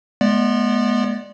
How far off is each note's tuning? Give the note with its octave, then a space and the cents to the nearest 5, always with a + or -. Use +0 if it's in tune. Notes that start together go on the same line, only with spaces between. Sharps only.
G#3 +30 B3 -25 D5 +0